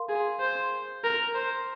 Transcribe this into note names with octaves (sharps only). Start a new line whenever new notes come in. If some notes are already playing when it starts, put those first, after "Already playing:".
Already playing: A#4 F5 C6
G#4
C5
A#4
C5